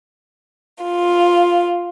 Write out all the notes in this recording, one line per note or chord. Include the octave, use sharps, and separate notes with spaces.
F4